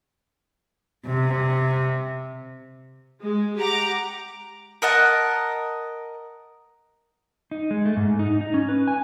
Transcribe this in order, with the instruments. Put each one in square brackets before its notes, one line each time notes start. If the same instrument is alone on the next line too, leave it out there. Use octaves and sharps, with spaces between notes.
[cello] C3
[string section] G#3
G4 F#5 A#5 D6
[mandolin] A#4 D#5 F#5 A5
[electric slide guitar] D#4
G#3
A3
G#2
D#4
D#4
C#4
B4
G#5